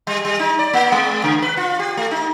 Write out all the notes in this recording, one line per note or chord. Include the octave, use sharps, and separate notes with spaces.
G3
G3
D#4
D5
A#3
G#3
C#3
B4
F4
G4
A3
D#4